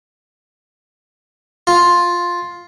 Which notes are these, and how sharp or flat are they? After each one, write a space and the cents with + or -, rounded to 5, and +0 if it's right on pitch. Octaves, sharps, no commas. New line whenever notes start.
F4 +5